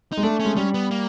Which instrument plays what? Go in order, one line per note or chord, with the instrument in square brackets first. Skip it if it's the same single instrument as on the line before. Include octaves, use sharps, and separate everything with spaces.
[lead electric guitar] D#4
[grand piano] G#3
[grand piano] A3 [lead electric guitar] D4
[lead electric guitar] C#4
[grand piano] G#3
[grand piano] G3 [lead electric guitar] C#4
[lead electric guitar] B3
A#3